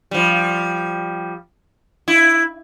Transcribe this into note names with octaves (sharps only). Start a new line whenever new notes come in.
F3 G3
E4